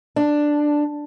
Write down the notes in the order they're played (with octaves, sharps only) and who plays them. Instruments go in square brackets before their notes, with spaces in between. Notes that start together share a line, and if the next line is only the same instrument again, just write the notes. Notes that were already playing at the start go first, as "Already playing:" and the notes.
[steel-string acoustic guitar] D4